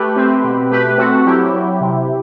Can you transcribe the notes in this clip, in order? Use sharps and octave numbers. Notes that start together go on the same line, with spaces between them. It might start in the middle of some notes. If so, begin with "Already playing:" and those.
Already playing: A3 G4 B4
C4
B2
A3 G4 B4
C4 F#4 A4
F#3 E4 G4
F#3
C3